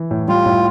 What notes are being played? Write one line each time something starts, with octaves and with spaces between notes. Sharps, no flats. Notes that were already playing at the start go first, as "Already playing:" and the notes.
Already playing: E3
A2
G3 F4
A2